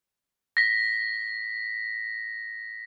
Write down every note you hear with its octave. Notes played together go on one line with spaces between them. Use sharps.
A#6 B6